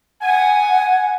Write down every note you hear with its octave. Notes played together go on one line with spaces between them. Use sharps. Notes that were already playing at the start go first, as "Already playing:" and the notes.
F#5 G#5